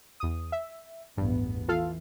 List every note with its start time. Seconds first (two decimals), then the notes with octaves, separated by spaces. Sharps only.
0.20 E2 D#6
0.52 E5
1.17 A1 E2 G2 B3
1.68 E3 F4 A4 F5